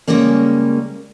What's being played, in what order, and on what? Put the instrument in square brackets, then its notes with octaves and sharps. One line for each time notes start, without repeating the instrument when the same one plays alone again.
[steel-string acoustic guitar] C#3 G3 G#3 A#3 C#4